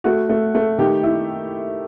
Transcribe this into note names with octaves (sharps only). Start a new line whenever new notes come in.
A3 F#4
A3
A3
D#3 G4
E4